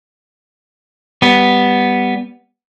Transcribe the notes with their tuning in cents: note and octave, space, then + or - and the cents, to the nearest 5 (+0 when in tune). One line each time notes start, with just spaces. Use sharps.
G3 +0 B3 +0